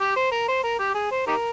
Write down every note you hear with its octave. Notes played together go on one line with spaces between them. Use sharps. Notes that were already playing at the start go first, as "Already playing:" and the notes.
G4
C5
A#4
C5
A#4
G4
G#4
C5
D#4 G4 A#4